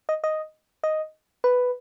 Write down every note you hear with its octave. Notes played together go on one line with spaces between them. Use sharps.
D#5
D#5
D#5
B4